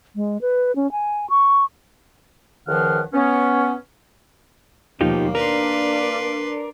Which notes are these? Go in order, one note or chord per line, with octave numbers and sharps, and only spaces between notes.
G#3
B4
C#4
G#5
C#6
C#2 D#3 F3 F#5 F6
B3 C#4
D#2 B2 F3 A#3 D#4 F4 G4
D4 A#4 B4 D5 C6